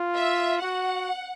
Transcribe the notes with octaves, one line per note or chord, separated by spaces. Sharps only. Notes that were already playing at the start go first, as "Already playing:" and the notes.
Already playing: F4
E5
F#4 F#5